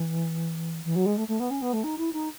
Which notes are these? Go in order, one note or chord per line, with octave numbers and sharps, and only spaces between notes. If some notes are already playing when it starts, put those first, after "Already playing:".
Already playing: E3
E3
F#3
G#3
A3
A3
B3
C#4
B3
A3
D#4
E4
D#4